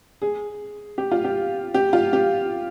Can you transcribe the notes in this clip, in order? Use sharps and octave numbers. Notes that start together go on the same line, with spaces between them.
G#4
G4
F4
G4
G4
F4
G4